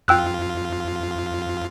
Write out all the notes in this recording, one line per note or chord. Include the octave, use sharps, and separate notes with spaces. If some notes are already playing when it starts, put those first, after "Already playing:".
F2 F4 G5 E6 F#6